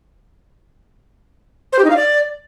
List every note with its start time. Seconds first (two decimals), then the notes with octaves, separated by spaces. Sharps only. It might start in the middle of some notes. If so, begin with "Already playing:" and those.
1.73 C5
1.79 G4
1.85 D#4
1.90 F5
1.96 D5